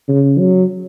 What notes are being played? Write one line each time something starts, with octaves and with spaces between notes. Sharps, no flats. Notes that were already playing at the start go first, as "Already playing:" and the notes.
C#3
F#3